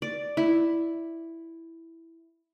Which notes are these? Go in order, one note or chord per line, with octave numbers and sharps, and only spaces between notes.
D5
E4